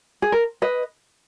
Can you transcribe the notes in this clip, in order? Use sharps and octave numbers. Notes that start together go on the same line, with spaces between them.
G#4
A#4
B4 D#5